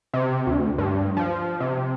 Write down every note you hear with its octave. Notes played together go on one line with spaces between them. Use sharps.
C3
D2
G2
F3
C3